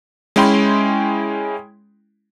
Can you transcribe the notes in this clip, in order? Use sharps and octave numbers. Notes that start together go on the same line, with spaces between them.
G#3 C#4 E4 G5 B5 C6